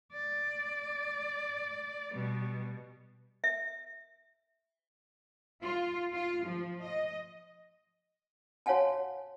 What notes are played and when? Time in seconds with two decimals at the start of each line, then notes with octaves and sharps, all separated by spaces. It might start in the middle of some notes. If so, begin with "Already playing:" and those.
0.13 D5
2.13 B2 G3
3.44 E5
5.63 F4
6.13 F4
6.44 F3
6.83 D#5
8.66 F#4 C#5 F5 F#5 G#5 A5